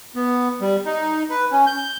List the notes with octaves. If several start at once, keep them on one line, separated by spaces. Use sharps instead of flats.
B3
G3
D#4
B4
C#4
G6